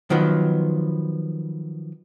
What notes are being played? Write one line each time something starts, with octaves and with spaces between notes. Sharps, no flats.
D#3 F3 F#3 B3